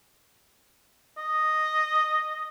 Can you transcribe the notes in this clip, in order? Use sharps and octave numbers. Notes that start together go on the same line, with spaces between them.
D#5